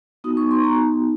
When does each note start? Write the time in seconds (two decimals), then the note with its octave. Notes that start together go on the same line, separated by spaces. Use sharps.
0.24 B3 D#4 F#4 D#6
0.37 C#6
0.51 C6
0.64 A#5